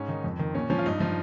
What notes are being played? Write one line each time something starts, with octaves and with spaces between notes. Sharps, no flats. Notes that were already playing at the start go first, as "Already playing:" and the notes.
Already playing: G#2 C#4
D#3 D#4
F2
D#3
A#2 C#4
F3 C#4
F4
G2 D#4
F3 D#4